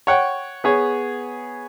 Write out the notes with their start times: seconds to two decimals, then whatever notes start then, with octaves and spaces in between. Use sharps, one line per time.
0.07 C#5 F#5 G5
0.64 B3 G#4 C#5